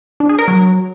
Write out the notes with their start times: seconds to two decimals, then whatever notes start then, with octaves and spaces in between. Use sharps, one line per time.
0.20 D4
0.29 G#4
0.39 A#4
0.48 F#3